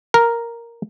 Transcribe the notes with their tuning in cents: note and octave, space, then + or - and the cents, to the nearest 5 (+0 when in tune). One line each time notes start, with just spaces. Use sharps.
A#4 +0